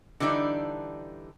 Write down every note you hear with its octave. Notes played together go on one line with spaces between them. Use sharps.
D3 E3 G3 D4 D#4